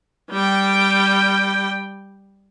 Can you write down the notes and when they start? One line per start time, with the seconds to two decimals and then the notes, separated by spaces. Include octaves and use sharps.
0.31 G3 G5